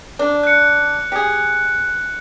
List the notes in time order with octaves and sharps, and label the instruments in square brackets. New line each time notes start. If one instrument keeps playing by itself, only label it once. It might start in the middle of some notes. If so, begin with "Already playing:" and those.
[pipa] D4
[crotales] F#6 C#7
[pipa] G4 G#4